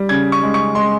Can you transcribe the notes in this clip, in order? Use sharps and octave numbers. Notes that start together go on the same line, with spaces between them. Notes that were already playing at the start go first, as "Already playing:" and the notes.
Already playing: G3
C#3 G#6
C#6
G#3
C#6
G#3 C6